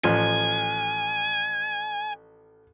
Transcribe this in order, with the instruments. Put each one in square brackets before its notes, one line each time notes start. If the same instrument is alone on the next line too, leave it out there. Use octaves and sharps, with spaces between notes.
[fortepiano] A1 F3 [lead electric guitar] G#5